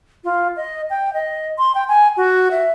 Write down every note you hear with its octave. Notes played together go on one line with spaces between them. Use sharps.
F4
D#5
G5
D#5
C6
G5
G#5
F#4
E5